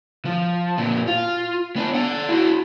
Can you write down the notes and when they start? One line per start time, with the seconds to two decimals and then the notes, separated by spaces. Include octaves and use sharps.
0.25 F3
0.78 A#2 C4
1.07 F4
1.76 B3 D4
1.95 D5 F#5
2.29 E4 F#4